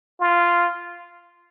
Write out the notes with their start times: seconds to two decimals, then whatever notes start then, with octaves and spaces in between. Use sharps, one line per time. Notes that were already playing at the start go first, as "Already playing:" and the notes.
0.20 F4